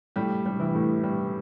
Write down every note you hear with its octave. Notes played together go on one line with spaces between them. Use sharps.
A2 G3 G4
G3
E3 E4
A2
G3